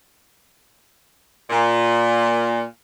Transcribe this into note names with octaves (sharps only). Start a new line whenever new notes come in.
A#2